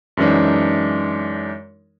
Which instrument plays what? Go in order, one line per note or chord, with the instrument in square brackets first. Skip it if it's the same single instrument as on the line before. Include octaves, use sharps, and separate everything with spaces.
[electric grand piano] F#2 E3 G#3 D4 D#4